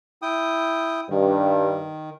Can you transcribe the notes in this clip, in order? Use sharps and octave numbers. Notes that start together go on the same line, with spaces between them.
E4 G5 D#6
G2 D#3